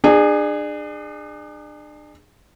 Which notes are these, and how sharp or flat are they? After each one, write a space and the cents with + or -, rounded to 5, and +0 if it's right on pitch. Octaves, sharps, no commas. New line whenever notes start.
D4 +35 G#4 -15